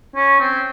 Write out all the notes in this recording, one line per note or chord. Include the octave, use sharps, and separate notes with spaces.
C#4
C4